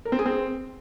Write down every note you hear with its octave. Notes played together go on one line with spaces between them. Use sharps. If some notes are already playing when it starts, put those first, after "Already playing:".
A#4
C4
G#4
C4